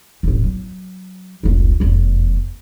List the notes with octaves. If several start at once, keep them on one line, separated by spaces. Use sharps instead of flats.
D#1 A1
F#3
F1 C#2
F1 E2